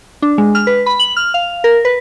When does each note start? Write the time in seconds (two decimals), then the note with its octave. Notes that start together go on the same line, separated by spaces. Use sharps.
0.22 D4
0.38 G#3
0.55 F6
0.67 B4
0.86 B5
0.99 F#7
1.17 F6
1.34 F5
1.64 A#4
1.85 B4